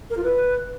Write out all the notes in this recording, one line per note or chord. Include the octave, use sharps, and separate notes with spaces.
A#4
F4
B4